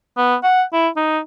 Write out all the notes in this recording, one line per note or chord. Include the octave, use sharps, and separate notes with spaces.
B3
F#5
E4
D#4